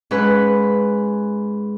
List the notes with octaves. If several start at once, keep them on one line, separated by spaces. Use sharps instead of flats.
G#2 C#4 B4 B5 F#6